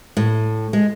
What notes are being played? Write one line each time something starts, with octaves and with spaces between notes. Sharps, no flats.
A2
G#3